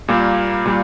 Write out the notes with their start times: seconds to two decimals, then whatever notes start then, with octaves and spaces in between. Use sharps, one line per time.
0.08 A#2 G3 A#3
0.66 A#2 G3